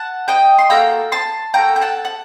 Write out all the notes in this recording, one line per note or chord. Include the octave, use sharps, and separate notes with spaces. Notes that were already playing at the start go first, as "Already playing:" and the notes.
Already playing: F#5 A5
D#5 G5
C6
A#3 F#4 A4 G5 A#5
A5 C6
A#3 F#4 A4 G5 A#5
G5
F#5 A5
F#5